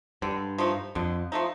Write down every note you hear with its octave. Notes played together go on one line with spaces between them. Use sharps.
G2 D3
F3 A3 D#4
F2 D3
F3 A3 D#4